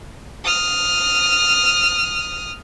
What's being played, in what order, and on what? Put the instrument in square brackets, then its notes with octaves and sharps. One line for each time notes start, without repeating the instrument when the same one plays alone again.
[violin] D#6 F6